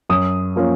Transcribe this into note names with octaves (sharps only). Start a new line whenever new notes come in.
F#2 D#6
F3 A#3 C#4